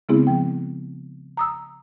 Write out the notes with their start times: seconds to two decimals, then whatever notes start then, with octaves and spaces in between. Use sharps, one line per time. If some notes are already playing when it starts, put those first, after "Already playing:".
0.09 C#3 G#3 B3 C4 E4 G#4
0.27 F3 G5
1.37 A#5 D#6 E6